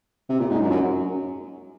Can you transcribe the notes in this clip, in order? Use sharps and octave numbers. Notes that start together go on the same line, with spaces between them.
C3
A#2
G#2
F#2
F#2